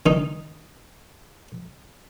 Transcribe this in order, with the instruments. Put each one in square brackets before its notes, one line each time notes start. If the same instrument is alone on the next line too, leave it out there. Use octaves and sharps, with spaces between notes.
[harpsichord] D#3 D#4